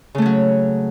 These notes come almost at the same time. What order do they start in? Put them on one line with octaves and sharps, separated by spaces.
C#3 A3 C#4 F#3